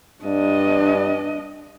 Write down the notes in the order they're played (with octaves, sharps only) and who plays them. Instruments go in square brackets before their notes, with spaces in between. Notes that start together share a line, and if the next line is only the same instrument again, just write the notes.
[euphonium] G2 [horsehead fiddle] D4 D#5